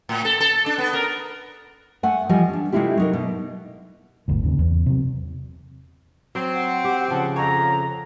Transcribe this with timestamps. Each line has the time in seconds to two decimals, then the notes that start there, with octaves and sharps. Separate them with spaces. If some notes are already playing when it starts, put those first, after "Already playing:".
0.09 A2
0.25 A4
0.40 A4
0.66 D4
0.78 B3
0.93 A#4
2.03 A3 F#5 G#5
2.29 E3 F3 G3 D#5 G#5
2.49 C#4 D4
2.72 C3 G#3 A3 E4 F4 G4
2.97 F#3 D#4 A#4
3.13 B2
4.28 G1 D2 G#2
4.44 D#2 G#2 C#3
4.59 E2
4.86 C3 F#3
6.35 F#3 C4
6.54 F#5
6.84 G4
7.10 C#3 F3 F#5
7.36 F2 C#5 A#5